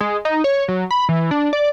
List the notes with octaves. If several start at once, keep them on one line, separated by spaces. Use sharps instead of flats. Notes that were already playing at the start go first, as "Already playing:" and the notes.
G#3
D#4
C#5
F#3
B5
E3
D4
D5